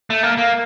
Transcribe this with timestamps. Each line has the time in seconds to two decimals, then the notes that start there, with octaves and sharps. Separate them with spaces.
0.10 A3
0.23 A#3
0.37 A#3